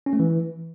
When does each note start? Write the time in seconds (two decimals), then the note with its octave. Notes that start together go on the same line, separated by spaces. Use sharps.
0.06 C#4
0.13 A3
0.19 E3